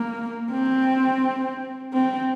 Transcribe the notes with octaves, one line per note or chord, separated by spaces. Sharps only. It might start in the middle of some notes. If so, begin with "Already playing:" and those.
Already playing: A#3
C4
C4